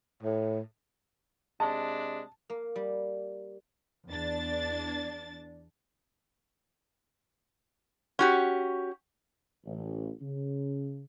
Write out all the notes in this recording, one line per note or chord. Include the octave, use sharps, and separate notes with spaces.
A2
C3 G#3 D4 A5
A#3
G3
E2 D4 A6
C#4 F#4 G4
A1
C#3